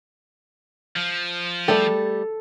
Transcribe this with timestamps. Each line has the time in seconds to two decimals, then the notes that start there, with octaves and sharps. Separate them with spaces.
0.96 F3
1.68 G3 A3 G4 A4